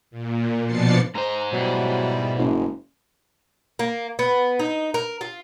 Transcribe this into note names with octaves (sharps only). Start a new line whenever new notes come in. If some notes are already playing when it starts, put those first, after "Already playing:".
A#2
B2 F3 D4 A6 C7 C#7
G#2 C5 A#5
B2 F#3 G3 E4
F#1
A#3
B3
D#4
A#4
F4